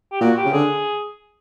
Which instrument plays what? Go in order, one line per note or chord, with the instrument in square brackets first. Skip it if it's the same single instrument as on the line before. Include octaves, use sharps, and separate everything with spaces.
[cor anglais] G4
[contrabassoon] A#2 [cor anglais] F#4
[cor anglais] G4
[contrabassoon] C#3
[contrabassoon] D3 [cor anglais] G#4